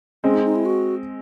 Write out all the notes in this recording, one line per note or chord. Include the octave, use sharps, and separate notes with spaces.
G#3 C4 C#4
D#4
D#4
E4
F#4